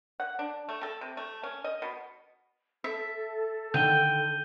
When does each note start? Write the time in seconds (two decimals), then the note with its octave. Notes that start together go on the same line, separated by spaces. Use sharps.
0.20 F#5
0.39 D4
0.69 A3
0.83 A4
1.01 C3
1.17 A3
1.43 C#4
1.64 D#5
1.82 B2
2.84 A4 E5
3.74 D3 D#3 G5 G6 D#7 G7